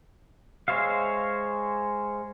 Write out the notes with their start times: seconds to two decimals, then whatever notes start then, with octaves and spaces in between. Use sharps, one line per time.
0.68 G#3 C5 C#5 E5 F5